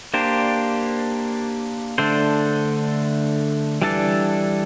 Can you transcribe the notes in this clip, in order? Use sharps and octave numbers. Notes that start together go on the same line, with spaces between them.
A#3 D4 G4 C5
D3 A3 D4 A4 C5
E3 G3 D4 A4